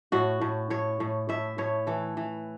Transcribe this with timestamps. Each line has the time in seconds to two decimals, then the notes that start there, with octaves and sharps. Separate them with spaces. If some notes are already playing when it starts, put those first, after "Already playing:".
0.12 A2 F#4
0.41 A2
0.70 A2 C#5
1.00 A2
1.29 A2 E5
1.58 A2 C#5
1.87 E3 A4
2.17 E3